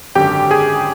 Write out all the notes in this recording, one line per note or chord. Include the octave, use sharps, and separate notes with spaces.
G#1 F#2 D3 G4 G5
G#4 G#5